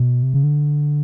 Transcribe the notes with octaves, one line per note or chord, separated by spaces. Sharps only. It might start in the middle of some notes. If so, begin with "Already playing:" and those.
Already playing: B2
C3
C#3
D3